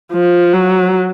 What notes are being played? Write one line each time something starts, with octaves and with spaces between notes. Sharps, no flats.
F3
F#3